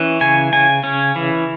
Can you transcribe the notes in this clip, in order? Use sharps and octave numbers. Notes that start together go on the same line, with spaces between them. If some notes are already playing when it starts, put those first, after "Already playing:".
Already playing: E3 C#4
C#3 G#5
C#3 G#5
C#4
E3